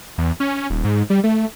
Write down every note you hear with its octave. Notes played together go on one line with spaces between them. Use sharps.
E2
C#4
D#1
G#2
G3
A3